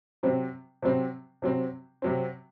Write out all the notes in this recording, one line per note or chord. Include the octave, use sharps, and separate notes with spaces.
C3 F#3 C4
C3 F#3 C4
C3 F#3 C4
C3 F#3 C4